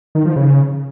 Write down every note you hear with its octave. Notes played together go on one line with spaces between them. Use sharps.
D#3
F3
C#3